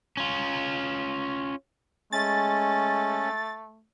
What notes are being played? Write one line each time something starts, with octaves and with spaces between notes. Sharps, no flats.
C#4 F4
G#3 A3 C#4 A6